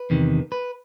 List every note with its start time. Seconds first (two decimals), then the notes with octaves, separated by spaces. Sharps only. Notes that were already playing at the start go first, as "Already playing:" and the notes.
Already playing: B4
0.10 E2 C3 D#3
0.52 B4